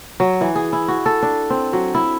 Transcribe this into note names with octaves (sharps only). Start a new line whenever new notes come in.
F#3
E3
G#4
E4
F#4
A4
D4
C4
F#3
E4